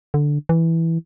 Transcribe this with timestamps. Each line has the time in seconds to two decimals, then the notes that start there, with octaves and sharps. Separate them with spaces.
0.14 D3
0.49 E3